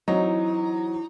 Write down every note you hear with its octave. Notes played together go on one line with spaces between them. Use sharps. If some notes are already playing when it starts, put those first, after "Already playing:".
E3 F#3 C4 D#4